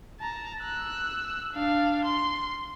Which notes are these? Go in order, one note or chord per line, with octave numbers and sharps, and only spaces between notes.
A5 A#5
E6 F#6
D4 F5
C6